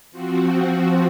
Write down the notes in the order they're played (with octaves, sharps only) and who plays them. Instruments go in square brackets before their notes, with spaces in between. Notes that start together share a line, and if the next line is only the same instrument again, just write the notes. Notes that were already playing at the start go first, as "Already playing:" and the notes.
[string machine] F3 C4 F#4